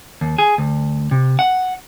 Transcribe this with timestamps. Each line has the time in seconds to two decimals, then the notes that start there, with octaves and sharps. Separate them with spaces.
0.21 D#2
0.38 G#4
0.58 D2
1.11 C3
1.39 F#5